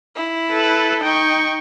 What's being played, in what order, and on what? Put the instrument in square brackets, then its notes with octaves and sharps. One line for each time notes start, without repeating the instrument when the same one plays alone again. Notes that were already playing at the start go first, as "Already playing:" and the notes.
[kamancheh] E4
[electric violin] A4 B4
[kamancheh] D#4 [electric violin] G5 C#6